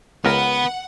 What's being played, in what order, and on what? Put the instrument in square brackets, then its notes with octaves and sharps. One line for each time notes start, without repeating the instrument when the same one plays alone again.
[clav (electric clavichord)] C#2 A#4 [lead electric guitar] B3 B4 [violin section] F#5